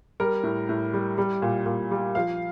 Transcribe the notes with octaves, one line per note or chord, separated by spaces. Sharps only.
G3 A#4
A2
A2
G3
G3
A#2
A#2
G3
F3 F5